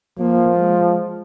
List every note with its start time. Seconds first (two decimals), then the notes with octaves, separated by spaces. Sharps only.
0.19 F3 A#3
0.56 G#3